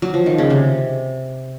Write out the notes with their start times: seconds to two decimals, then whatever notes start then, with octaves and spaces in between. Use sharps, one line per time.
0.02 F#3
0.14 F3
0.26 D#3
0.38 C#3
0.50 C3